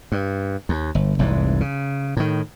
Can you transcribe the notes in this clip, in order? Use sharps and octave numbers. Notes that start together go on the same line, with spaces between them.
G2
D#2
G1
F1 C2 G#2 E3
C#3
A2 D#3